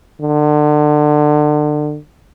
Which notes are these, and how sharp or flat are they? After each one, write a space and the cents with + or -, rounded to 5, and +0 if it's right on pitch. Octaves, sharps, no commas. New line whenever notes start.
D3 +30